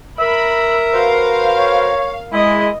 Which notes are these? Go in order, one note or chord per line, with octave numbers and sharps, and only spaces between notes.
A#4 E5 A#5 B5
F#4 B4 C5 F5
C#5
G#3 E4 D#5 D#6